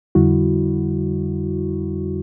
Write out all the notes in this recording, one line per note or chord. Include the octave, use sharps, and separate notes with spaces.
F2 D3 G3 E4 F#4